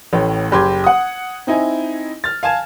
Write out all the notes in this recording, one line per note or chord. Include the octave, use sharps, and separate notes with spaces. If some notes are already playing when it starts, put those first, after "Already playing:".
A1 A2 G5
F#1 G4 B5 C6 D6 G#6
F#5 D#6
C4 D#4 E4 G#5
F6 A6
F5 G#5 A5 G#6 E7